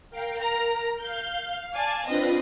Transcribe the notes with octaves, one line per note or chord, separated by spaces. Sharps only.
A#4 F5 G5
A#4 A#5
F5 G6
D5 G#5 A5
C4 D4 F4 B4 D#5